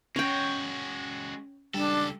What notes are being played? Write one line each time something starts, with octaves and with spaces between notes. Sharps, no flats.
G#3 C#4 F#4 C#5 G5
C#2 G3 D4 A4